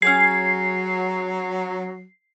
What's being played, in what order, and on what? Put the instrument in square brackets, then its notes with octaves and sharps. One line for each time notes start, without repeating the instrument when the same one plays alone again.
[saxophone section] F#3 [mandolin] C#4 G4 G#4 [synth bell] C7